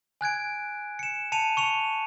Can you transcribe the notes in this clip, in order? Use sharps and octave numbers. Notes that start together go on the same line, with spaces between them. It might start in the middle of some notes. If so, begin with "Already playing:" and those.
G#5 F#6 G#6 D7
C#7 E7
A5 C#7 D#7 F7
C#6 C#7 F7